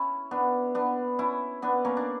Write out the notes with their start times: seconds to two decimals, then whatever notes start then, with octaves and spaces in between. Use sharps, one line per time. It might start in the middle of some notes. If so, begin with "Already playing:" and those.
Already playing: C#4 E4
0.31 B3 D4
0.75 B3 D4
1.19 C#4 E4
1.62 B3 D4
1.85 A#3 C#4
1.97 D4